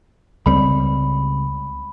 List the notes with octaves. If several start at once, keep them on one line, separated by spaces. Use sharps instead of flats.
C#2 G3 C4 B5